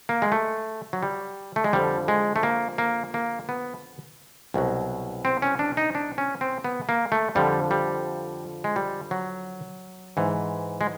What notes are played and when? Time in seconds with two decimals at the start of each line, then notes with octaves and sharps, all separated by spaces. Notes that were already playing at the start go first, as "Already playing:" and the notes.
0.09 A#3
0.22 G#3
0.32 A3
0.93 F#3
1.03 G3
1.56 A3
1.64 G#3
1.73 F2 D3 F3 G3
2.08 G#3
2.36 A3
2.43 A#3
2.78 A#3
3.14 A#3
3.49 B3
4.54 C2 B2 F#3
5.25 C4
5.42 C#4
5.59 D4
5.77 D#4
5.95 D4
6.18 C#4
6.41 C4
6.65 B3
6.89 A#3
7.12 A3
7.35 F2 D3 F3 G3
7.71 G3
8.64 G#3
8.76 G3
9.11 F#3
10.17 G#2 E3
10.81 G#3